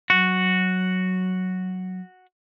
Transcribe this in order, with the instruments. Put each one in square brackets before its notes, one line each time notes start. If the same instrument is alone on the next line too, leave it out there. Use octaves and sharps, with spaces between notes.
[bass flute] F#3 [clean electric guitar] F#4